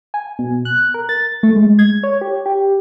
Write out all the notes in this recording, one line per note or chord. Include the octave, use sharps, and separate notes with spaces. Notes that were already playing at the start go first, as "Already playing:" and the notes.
G#5
B2
F#6
A#4
A6
A3
G#3
G#6
C#5
G4
G4